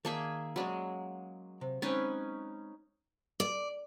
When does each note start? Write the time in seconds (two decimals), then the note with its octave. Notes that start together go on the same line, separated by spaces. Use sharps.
0.05 D#3 A#3 G#4 D5 E5 A5
0.56 F#3 G#3 C#4 D5 B5
1.61 C3
1.82 G#3 C4 C#4 D#4 B4
3.40 D5